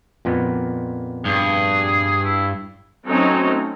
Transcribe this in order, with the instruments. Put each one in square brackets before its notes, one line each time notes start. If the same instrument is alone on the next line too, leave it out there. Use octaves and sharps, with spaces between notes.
[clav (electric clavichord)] F2 A#2 B3
[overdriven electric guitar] G2 [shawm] G#4
[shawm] E4
[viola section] F#3 A3 C4 C#4 D#4